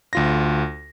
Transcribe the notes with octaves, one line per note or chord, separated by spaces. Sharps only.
D2 F4 A#6